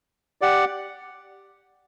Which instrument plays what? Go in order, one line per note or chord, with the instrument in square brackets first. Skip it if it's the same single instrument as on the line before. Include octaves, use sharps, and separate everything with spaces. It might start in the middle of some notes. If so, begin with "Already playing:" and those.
[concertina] G4 D5 F#5